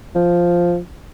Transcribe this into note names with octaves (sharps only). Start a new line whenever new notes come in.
F3